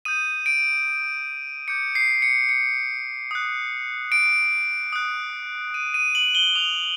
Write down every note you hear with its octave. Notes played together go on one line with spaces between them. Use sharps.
D#6 G6 D#7
D7
D6 G6 C#7
C7
C#7
C#7
D#6 F#6
D7
D#6 F#6
D#7
D#7
F#7
G7
D#6 F#6 F7